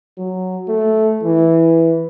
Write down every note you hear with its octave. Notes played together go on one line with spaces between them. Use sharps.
F#3
A3
E3